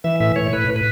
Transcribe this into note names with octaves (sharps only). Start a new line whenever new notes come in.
E3 E5
A2 E5
A2 C#5
A2 B4
A2
B4